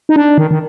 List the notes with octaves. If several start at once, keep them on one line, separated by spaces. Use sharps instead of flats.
D#4
D4
D#3
D#3